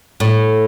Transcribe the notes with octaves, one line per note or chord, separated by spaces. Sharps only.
A2